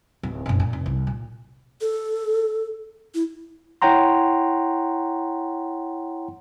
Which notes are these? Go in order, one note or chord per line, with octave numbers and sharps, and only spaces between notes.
D1
F#1 B1
A#2
F1
C2
A#2
A4
E4
E4 C#5 F#5 G5 A#5 C6